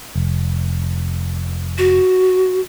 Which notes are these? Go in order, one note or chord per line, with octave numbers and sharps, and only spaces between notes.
F1
F#4